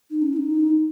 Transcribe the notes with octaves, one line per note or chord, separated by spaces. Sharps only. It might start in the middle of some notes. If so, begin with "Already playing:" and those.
D#4
C#4
E4
D#4